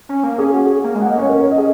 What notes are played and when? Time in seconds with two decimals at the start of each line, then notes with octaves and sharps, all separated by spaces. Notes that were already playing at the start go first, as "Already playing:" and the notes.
0.09 C#4
0.23 A#3
0.38 C#4 G#4
0.52 F#4
0.65 G#4
0.84 A#3
0.95 G#3
1.00 F#5
1.06 A#3 D#5
1.18 C#4 C#5
1.29 A#4
1.40 C#5
1.51 D#5
1.58 G#4